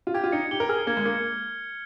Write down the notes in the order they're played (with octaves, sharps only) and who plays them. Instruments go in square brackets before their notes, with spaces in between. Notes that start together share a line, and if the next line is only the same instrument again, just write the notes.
[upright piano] F4
[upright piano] G4 [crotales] G#6
[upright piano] F4
[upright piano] D#4 [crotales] C#7
[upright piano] G4 [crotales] G7
[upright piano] A#4
[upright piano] G#4 [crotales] F6
[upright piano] A#3 [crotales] G#6
[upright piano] G#3
[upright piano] A#3 [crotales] C#7